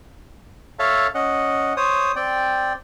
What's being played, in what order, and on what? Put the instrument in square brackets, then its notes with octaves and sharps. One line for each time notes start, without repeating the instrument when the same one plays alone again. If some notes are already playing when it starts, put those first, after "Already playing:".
[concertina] A4 C#5 E5 F5 A5
C#4 D#5 F#5
C5 C#5 D#6
C4 D5 G5